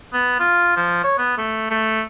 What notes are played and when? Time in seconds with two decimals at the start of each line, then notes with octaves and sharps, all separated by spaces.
0.13 B3
0.39 F4
0.76 F3
1.04 C#5
1.18 B3
1.38 A3
1.70 A3